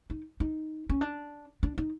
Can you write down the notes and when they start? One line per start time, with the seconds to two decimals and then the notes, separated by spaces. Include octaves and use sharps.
0.10 D#4
0.40 D#4
0.89 C#4
1.01 D4
1.63 D4
1.78 D#4